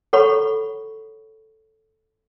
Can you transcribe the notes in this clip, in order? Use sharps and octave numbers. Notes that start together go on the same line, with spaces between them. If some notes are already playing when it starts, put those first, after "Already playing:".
A4 C#5 F#5 A#5 B5 C#6